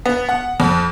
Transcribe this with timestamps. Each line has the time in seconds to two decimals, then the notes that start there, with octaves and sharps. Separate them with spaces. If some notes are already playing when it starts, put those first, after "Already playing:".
0.06 B3
0.29 F#5
0.60 F2